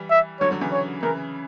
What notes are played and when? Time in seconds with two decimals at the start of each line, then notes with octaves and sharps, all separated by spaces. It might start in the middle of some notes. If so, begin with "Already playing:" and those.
Already playing: E3 G3
0.10 E5
0.41 D3 F#3 C#5
0.51 D3 F#3
0.61 C#3 E3
0.72 C#5
1.02 C#3 E3 A#4